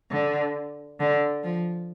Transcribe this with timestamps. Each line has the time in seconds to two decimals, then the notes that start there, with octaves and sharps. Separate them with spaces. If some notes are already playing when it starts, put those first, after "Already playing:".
0.11 D3
1.00 D3
1.44 F3